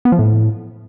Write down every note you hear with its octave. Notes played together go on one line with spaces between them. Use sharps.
B3
F3
A2